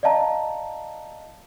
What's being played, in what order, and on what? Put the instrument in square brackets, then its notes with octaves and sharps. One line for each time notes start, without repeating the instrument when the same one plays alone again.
[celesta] D5 D#5 F5 A5 A#5